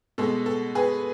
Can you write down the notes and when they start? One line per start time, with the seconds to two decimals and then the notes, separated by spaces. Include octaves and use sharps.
0.18 B2 G#3 A4
0.46 A4
0.75 G#4 B4